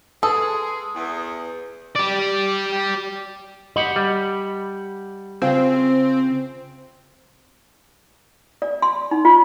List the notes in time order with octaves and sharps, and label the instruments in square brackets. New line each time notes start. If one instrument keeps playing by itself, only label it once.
[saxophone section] G#3 G#4 [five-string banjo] A4 [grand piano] B4 D#6
[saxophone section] E2
[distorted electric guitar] G4 D5
[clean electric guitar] G4 F#5 B5 [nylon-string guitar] D#5
[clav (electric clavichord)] G3
[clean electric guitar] C#3 G#4 [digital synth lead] C4 [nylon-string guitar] F4 C5 F5
[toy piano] D5
C6
D#4
F4